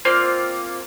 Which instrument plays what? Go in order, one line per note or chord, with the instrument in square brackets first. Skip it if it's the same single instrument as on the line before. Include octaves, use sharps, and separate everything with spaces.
[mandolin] A#3 C4 F4 D5